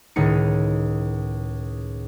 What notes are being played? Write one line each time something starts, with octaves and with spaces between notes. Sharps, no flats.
C#2 A2 D#3 D#4 C#7